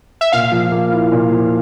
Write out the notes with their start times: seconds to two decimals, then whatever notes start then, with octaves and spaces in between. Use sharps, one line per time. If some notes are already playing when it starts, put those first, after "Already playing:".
0.21 E5
0.32 A#2 F5
0.52 F3
0.72 A#3
0.92 E4
1.12 A#2
1.31 F3